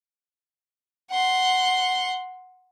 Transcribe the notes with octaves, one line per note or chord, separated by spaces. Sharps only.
F#5 C6